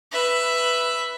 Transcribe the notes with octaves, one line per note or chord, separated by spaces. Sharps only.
B4 E5